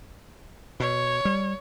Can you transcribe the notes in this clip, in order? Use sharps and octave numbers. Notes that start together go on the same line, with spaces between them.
B2 C#5
G3